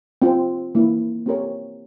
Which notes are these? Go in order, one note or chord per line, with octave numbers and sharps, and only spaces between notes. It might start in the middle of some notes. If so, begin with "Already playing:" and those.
C4 F4 C5
E3 A#3 E4
C4 G4 A#4 C#5